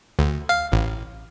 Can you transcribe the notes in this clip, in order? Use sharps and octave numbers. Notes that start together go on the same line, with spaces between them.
D2
F5
A1